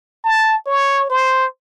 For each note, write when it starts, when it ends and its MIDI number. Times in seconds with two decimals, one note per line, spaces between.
0.24 0.56 81
0.67 1.07 73
1.10 1.45 72